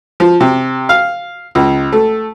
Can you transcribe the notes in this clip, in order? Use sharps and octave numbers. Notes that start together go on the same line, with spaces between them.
F3
C3
F5
C#2
A3